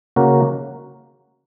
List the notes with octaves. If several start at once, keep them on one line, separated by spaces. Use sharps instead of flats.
C#3 A#3 F#4 A#4